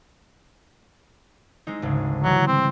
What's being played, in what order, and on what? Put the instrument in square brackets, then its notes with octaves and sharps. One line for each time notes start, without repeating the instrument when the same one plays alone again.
[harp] G#3 C4 D#4
G#1 D2 C#3
[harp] E3 G3 [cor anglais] F#3
[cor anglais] C4